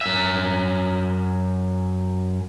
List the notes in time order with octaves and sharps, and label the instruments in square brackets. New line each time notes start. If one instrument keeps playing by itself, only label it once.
[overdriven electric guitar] F#2 E5